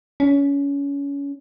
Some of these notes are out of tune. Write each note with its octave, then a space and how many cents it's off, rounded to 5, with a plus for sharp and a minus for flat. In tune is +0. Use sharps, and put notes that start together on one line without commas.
C#4 +25